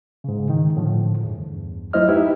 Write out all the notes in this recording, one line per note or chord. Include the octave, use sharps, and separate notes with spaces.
G#2 C#3
D#3
A2 D3 F3
E2 G2
F#3 A3 E4 C5 D#5 F6
D#4 E4 G4 B4 E5